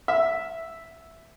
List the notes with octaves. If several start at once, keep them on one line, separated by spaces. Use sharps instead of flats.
E5